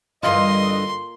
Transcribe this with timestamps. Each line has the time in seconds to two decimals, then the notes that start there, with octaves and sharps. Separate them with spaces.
0.23 G2 D3 E3 A#3 F4 D#5 C6